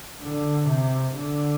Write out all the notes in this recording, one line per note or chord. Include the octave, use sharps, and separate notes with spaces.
D3
C3
D3